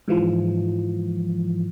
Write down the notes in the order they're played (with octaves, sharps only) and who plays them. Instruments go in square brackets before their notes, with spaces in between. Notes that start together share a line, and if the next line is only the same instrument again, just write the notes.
[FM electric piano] G#2 E3 F3